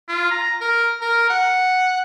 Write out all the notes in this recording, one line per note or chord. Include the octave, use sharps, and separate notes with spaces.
F4
A#5
A#4
A#4
F#5